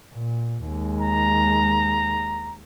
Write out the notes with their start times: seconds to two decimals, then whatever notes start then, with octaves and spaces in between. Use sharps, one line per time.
0.13 A#2
0.66 D#2 G#3
1.01 A#5